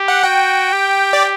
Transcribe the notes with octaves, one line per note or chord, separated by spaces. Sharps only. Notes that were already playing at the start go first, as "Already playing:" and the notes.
Already playing: G4
F#5
F#4 G5
G4
D5